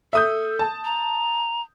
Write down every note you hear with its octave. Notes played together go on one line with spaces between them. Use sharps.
A4 E5 D#6 G6
A5
A#5